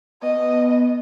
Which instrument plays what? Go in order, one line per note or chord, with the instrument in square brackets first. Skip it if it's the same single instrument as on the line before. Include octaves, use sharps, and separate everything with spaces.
[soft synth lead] B3 [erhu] D#5